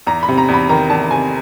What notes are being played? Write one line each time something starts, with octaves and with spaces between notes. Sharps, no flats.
E2 A#5
B5
C3
A#5
E2
B5
D#3 A#5
E2 A5
C3 G#5